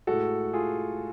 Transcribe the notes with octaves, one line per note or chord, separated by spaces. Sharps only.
A2 G#3 F#4 A4
F4 G#4